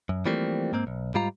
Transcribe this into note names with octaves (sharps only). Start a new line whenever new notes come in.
F#2
E3 F3 G3 A3 A#3 C4
G#2 A#3 C4
B1
G#2 G3 F4 A#5